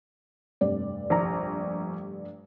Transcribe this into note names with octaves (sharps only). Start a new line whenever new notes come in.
F1 G2 D5
A#1 A#5